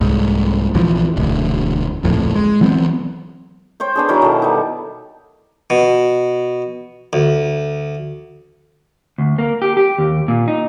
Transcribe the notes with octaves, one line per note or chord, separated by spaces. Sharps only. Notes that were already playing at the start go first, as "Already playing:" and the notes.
C2 G#2
A#1 E2 E3 F3
E1 D2
D1 A#1 F2 A2
G#3
E3 F#3 B3 C4
C5 C#5 G5
B3 D4 G#4
D#3 F#3 E4 A#4
B2 A4
G3 D#4
B2
D2
D2
A#3
G4
G4
D#2
A#2
D#4